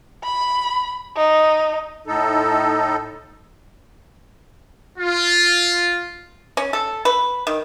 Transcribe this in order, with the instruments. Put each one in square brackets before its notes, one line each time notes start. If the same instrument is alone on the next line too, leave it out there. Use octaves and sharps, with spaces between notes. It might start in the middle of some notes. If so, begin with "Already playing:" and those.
[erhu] B5
D#4
[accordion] A2 D#4 A4
[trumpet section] F4
[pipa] C#4
A4
B4
D#3